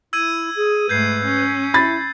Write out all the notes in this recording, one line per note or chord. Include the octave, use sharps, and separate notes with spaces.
E4 E6 G#6 D#7
G#4
G#2 A3 B4 G6 G#6 C7
C#4
E4 B5 A6